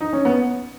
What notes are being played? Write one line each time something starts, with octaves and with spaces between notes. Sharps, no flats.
D#4
C#4
B3